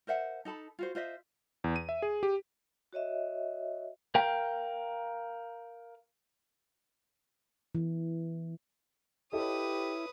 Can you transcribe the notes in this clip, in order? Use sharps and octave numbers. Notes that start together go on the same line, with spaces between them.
A#4 C5 E5 F#5
D#4 A4 A5 B5
F4 F#4 C5
F4 C5 D#5 E5
E2
D#7
E5
G#4
G4
F#4 C#5 D#5 E5
A#4 F5 G5
E3
E4 G4 A4 B4 C#5 D#5 D#6